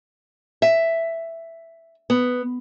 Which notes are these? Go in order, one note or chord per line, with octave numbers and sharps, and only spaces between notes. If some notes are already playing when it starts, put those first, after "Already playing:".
E5
B3